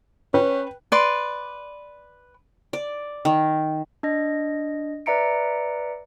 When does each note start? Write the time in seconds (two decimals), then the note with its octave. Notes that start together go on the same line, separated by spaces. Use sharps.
0.34 C#4 B4 G5
0.92 B4 D5 C6
2.73 D5
3.25 D#3
4.03 D4 D#5 A#6
5.06 B4 D5 E5 A#5 C#7 D7